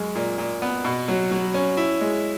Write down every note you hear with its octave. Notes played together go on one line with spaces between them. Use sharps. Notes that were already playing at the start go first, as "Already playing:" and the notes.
Already playing: F#2 G#3
A#2
A#2
B3
B2
F#3
F#3
C#4
E4
G#3